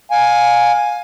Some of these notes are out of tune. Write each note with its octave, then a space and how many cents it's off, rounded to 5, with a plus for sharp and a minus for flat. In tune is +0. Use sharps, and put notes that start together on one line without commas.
F5 +20 G#5 +0